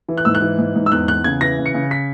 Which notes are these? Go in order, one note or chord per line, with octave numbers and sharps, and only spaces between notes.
E3
F#6
G#2 E6
F#6
E3
G#2
G#2
E6
E2 F#6
E2 F#6
C#3 G#6
E3 A#6
C#3
C#7
C#3
B6